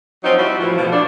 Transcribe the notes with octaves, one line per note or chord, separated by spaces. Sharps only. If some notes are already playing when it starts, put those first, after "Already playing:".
F3 F#3 C4 D#4
G3 E4 F#4
A2 E3 F3
B2 F3
A3 D4